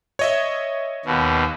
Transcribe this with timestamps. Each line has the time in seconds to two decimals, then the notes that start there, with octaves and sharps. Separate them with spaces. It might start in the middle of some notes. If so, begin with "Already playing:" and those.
0.19 C#5 D#5 E5
1.06 D#2 B2